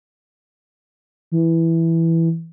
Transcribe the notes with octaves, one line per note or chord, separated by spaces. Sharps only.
E3